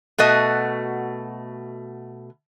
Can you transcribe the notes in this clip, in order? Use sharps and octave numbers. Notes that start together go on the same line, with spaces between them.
B2 A3 F#4 D#5